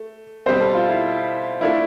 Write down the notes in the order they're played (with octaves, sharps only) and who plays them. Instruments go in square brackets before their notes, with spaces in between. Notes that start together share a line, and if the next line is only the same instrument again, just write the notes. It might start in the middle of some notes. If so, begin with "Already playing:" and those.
Already playing: [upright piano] A3
[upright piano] B2 G3 C4 [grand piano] C5
[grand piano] A4
F4
E4
[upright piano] A3 D4 F4 [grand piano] E4